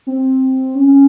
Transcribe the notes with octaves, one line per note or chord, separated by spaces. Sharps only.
C4
C#4